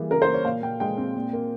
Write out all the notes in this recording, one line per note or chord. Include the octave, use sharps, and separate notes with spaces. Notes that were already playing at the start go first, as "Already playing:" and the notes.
Already playing: E3 G3 A#3 G#4
C#3 A#4
C5
A#3
C#5
A#2 F5
A#2 G5
G#3 G5
C4
A#2
A#3